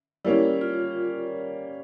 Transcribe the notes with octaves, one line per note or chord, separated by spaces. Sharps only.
G3 A#3 C#4 E4
F4